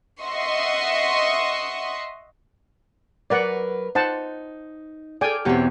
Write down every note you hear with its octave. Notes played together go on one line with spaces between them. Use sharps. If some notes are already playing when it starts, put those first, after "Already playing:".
D#5 E5 F#5 C6 C#6
F#3 A#4 B4 D5 F#5
D#4 C5 F#5 A5
G#4 A4 D5 G5 G#5 D6 F6
E2 B2 C4 G4 C#5